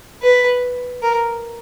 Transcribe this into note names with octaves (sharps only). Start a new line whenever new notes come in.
B4
A#4